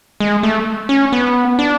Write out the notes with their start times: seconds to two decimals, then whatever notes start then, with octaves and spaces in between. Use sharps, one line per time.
0.20 G#3
0.43 A3
0.89 C#4
1.12 B3
1.59 D4